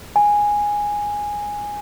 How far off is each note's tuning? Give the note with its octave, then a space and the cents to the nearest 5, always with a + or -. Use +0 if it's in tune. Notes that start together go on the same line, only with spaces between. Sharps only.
G#5 -5